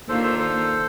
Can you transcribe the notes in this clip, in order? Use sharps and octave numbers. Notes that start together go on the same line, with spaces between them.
D#2 D#3 A#3 D4 F4 A4 C5
A4 C5
A4 C5